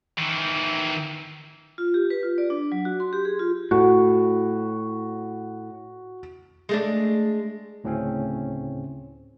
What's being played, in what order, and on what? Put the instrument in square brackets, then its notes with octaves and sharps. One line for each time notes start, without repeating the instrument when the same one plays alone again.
[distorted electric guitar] D#3 E3
[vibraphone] F4
G4
B4
F4
D5
D4
F#3
F#4
C6
G4
G#4
F4
[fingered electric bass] A2 [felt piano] F#4
[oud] G#3 A3 D4
[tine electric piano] D2 A2 C#3 C4 C#4